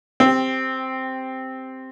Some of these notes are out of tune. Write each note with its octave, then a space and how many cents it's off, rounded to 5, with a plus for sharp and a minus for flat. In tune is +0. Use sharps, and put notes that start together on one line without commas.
C4 +0 G4 +20